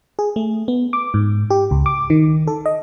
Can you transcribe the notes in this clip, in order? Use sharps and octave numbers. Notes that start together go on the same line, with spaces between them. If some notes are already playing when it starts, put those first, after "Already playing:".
G#4
A3
B3
D6
G#2
G4
C#2
D6
D#3
A4
D#5